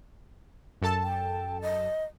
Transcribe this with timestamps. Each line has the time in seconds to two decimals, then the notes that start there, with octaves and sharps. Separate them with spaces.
0.82 F#2 A4 A5
1.02 G5
1.62 D#5